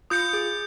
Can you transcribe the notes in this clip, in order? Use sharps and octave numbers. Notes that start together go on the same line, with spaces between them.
F4 D#6 G6 C#7
G#4